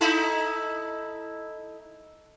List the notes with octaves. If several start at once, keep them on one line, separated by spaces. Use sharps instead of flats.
D#4 E4 A4